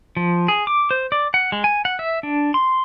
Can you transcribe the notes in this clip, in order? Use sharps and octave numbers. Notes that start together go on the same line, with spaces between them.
F3
G#4
D6
C5
D5
F#5
G#3
G#5
F#5
E5
D4
C6